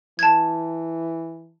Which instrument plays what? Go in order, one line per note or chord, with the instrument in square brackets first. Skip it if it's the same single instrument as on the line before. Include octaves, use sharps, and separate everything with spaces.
[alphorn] E3 [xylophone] A5 G#6